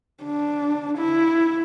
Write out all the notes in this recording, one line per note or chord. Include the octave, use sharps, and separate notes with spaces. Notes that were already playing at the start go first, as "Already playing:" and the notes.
D4
E4